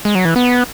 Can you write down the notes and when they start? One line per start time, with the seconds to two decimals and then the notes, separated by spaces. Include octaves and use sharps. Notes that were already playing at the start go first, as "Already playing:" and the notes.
0.05 G#3
0.15 F#3
0.25 E3
0.36 B3